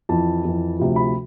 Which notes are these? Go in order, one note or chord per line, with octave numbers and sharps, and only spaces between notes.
F2 E3 A5
F2 E3
D2 C3 F3
B5